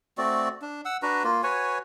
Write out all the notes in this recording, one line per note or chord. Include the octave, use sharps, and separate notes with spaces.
A3 C4 F#4 D5
D4
F#5 E6
D4 F#4 B4 A#5
A#3 F4
F#4 B4 C#5 G#5